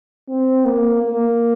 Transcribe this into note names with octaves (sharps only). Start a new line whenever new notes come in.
C4
A#3
A#3